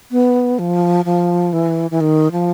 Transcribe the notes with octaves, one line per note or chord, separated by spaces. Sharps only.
B3
F3
F3
E3
E3
D#3
F3